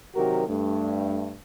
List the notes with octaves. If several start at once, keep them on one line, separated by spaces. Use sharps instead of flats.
C3 D#3 F#3 F#4 G4 A#4
G2 A3